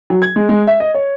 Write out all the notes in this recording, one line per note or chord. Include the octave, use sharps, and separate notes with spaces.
F#3
G#6
G#3
G#3
E5
D#5
C#5